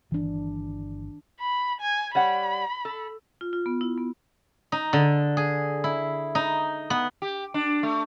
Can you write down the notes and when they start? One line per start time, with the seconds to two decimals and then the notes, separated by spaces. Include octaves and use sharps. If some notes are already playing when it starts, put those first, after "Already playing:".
0.11 G1 D#3 E3 D4
1.40 B5
1.81 G#5
2.15 G3 C#5 F#5 B5
2.85 A4
3.41 F4
3.53 F4
3.66 B3
3.81 E4
3.98 B3
4.72 D#4
4.93 D3
5.37 G#4
5.84 E4
6.35 D#4
6.90 B3
7.22 G4
7.54 D4
7.83 A3